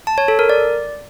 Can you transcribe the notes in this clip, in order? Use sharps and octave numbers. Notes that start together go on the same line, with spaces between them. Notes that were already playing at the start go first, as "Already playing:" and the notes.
A5
C#5
A4
A#4
D5